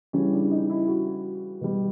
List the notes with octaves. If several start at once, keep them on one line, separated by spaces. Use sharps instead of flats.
C#3 E3 G3 C#4
D4
D#4
E4
F#4
B2 G3